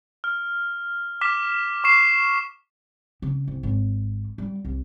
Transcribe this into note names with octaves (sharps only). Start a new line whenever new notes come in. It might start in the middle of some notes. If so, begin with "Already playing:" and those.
F6
D6 F6 B6 E7
C#6 D6 C7 E7
C#3
C2
G#1
G3
C2